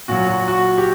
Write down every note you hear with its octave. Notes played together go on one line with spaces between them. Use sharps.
A#2 F#3 F#4
F#4
F#4
G4